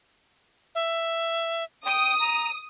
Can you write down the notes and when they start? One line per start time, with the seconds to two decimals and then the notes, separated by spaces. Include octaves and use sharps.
0.75 E5
1.85 G5 D#6
2.20 A#5